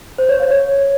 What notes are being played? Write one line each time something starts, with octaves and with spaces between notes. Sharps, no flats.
C5
C#5
F5
C#5